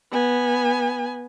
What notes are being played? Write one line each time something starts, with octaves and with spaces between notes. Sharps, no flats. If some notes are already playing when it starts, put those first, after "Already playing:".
B3 G#5